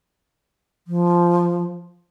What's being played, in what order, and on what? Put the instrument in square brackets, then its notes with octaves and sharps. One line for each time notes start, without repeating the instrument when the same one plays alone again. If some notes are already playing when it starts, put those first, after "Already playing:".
[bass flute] F3